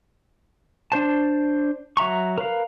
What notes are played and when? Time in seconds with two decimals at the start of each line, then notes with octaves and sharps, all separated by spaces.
0.92 D4 C5 A5
1.97 F#3 E5 A#5 C#6
2.38 A#4 B4 F5